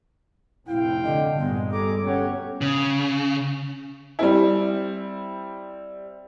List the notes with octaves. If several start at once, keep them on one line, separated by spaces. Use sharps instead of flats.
F1 A2 C3 C4 E4 F5 G5
D3 D#5
G1 G2 A#2 G#3 B3
G3 G#4 A4 A#5 D6
B2 B3 C#4 G4 C#5 F#5
C#3
G3 C4 E4